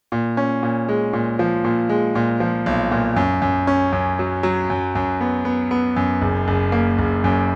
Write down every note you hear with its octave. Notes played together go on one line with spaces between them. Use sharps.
A#2
C#4
A#2
G#3
A#2
F3
A#2
G#3
A#2
F3
B1
A#2
F#2
F#2
C#4
F#2
F#3
F#3
F#2
F#2
B3
B3
B3
F#2
F#1
F#1
A#3
F#1
F#2